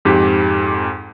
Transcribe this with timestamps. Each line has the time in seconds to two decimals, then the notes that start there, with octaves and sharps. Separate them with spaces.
0.05 F2 G#2 G4 B6